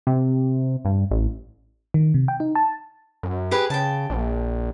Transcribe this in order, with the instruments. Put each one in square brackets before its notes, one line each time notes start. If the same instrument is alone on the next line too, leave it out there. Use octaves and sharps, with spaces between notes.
[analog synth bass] C3
G2
A1
[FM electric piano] D#3
C3
G5
D#4
A5
[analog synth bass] F#2
[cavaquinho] G4 G#4 B4
[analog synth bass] C#3 [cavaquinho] G5 A5
[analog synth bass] A#1